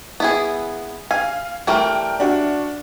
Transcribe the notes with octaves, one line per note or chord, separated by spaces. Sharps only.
B3 E4 G#4
F5 G#5
E3 G3 A3 A#4 G5 F6
D4 F#4